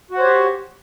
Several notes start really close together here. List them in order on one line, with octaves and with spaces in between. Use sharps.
F#4 F#5 C5 C#5 G4